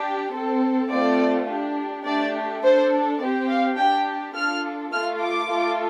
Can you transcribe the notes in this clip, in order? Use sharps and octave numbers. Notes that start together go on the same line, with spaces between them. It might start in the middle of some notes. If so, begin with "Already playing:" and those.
Already playing: D4 G4
C4 A4
A3 C4 F4 A4 D5
D4 G4
A3 D4 G4 D5
D4 A4 C5
C4 G4 D5
F5
D4 G4 G5
D4 F4 A4 F6
A3 F4 A4 F6
D6
A3 F4 A4